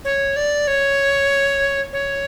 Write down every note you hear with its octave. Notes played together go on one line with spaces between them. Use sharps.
C#5
D5
C#5
C#5